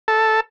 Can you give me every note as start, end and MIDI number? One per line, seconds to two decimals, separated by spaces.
0.08 0.40 69